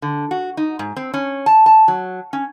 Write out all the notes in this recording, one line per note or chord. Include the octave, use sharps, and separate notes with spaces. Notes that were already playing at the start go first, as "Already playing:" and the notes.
D3
F#4
D#4
G#2
C4
C#4
A5
A5
F#3
C#4